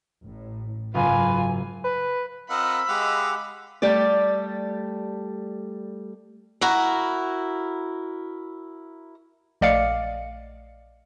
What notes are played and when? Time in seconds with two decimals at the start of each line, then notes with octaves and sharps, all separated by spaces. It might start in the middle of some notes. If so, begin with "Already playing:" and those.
0.24 A1 A2
0.95 F#1 G#2 F4 B4 G#5
1.84 B4
2.50 C4 F4 A#4 D#5 F#5 B5 E6
2.89 G#3 G4 D#5 F5 F#5
3.82 G3 A3 G4 D5
6.61 E4 F#4 A#4
9.61 A#1 A3 D5 D#5 F5 C#7